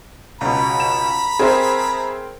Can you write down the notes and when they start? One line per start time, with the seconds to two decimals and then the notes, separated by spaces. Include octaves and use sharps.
0.41 C#2 B2 A#5 B5
0.80 E7
1.39 C4 G#4 A#4 C5 E5